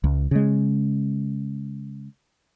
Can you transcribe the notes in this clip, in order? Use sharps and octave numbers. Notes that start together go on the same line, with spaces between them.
C#2
C#3 G#3